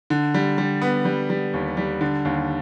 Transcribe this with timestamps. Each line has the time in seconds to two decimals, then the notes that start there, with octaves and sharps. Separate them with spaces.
0.10 D3
0.34 G3
0.58 G3
0.82 B3
1.05 G3
1.30 G3
1.54 D#2
1.77 G3
2.01 D3
2.25 D#2